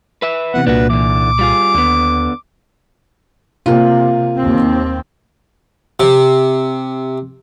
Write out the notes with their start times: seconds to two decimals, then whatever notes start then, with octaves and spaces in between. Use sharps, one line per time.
0.22 B4 E5
0.54 C3 E3 B3 F#5
0.67 C2 A#2 D4 F#4 B4
0.90 D3 E3 D6
1.39 G3 F4 G#4
1.75 D#2 D3 B3
3.66 C3 A#3 F4
4.36 D#2 C4
6.00 C3